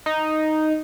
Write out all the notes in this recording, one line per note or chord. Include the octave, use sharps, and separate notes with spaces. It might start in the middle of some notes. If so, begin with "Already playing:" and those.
D#4